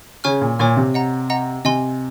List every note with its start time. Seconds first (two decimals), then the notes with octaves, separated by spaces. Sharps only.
0.24 C#3 C#5 G#5 C#6 F6
0.41 A#2
0.59 A#2 C#5 G#5 C#6 F6
0.77 C3
0.94 D#5 F#5 A#5
1.30 D#5 F#5 A#5
1.65 C3 D#5 G#5 C6